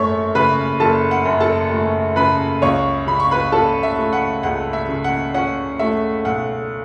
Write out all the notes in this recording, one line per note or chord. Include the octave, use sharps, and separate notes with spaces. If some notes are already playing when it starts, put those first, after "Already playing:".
Already playing: F#1 F#2 A3 C#5 E5 C#6
C#3 B4 B5
F#1 A4 A5
F#5
F#2
A4 A5
A3
C#3 B4 B5
C#2 C#5 C#6
C#3 B5
C#6
B4 B5
C#4 A4 A5
E5
A3
F#5
C#2 F#5
E5
C#3
F#5
C#4 F#5
A3 E5
B1 F#5